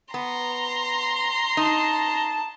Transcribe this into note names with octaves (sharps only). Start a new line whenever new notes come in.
B3 A#5 C6
D#4 A5